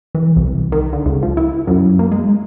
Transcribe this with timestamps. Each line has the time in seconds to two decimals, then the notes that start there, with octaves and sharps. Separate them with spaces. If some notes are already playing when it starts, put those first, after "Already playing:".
0.15 E3
0.36 C2
0.72 D#3
0.93 D3
1.06 C#2
1.23 F3
1.37 E4
1.67 F#2
1.99 A#3
2.12 G#3